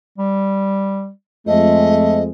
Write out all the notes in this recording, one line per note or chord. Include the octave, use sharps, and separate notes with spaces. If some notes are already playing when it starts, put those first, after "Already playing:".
G3
F2 G#3 A3 D#5